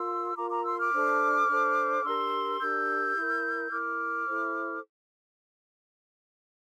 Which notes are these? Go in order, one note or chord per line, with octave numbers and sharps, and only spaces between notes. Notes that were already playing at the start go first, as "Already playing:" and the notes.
Already playing: F4 A#4 C6 E6
F4 A#4 A#5 D6
A#5 D6
C6 E6
D6 F6
D4 A4 C5
D4 A4 C5
D4 G4 A#4 C6 E6
D4 G4 A#4 E6 G6
E4 A#4
E4 A#4 D6 F6
E4 A4 C5